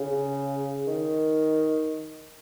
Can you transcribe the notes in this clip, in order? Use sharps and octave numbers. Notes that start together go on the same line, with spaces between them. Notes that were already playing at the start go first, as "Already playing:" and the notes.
Already playing: C#3
D#3